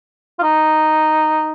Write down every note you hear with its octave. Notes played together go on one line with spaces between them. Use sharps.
F4
D#4